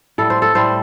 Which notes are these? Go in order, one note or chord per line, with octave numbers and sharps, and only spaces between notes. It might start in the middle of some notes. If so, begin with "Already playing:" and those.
A2 G3 A4
C5
A4
A2 G3 C5